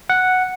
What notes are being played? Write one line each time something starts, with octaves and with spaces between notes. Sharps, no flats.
F#5